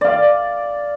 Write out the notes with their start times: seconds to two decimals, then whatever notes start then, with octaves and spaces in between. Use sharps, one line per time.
0.01 D5 F5